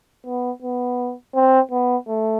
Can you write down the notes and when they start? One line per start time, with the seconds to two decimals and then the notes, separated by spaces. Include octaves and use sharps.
0.26 B3
0.62 B3
1.35 C4
1.71 B3
2.08 A3